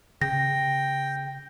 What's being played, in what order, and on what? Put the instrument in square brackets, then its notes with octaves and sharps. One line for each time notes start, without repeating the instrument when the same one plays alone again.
[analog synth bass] C#3 [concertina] G5 [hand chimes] A#6